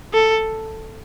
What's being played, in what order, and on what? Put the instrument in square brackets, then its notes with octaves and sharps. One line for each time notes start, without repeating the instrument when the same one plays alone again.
[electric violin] A4